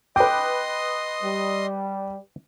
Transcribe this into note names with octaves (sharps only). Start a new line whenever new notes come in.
B4 D#5 G5 C6 D6 D#6
G3